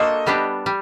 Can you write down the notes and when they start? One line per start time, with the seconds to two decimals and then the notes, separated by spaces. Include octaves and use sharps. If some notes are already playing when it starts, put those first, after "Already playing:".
Already playing: A#3 D4 F#4 A4 C5 D#5
0.27 G3 B3 D4 G4
0.66 G3